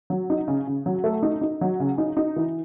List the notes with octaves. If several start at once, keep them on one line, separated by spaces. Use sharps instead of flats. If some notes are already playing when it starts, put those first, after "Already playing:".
F#3
D#4
C#3
C#3
F#3
A3
D#4
D#4
F#3
C#3
D#4
D#4
E3